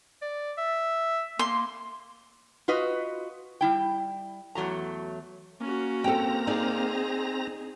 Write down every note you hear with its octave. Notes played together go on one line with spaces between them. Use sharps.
D5
E5
A#3 C6
F4 F#4 B4 D#5
G3 E4 G5
E2 F#3 A3 A#5
A#3 C#4 F#4
C4 A4 G5 A#5
D#4 G#4 D5